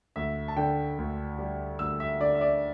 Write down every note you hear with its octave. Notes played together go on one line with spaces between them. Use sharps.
D2 E5
A5
D3 G5
D2
G3
D2 E6
E5
D3 D5
E5
D5